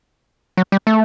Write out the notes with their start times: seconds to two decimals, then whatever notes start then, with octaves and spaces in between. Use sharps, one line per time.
0.57 F#3
0.72 G3
0.87 A3